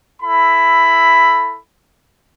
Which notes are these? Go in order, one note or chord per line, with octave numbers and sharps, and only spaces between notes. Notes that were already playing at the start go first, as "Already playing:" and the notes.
E4 A4 B5